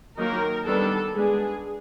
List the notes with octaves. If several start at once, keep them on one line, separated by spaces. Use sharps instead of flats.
D#3 F#3 A#3 D#4 A#4
D#3 G3 B3 D4 A4
G#3 B3 D4 G#4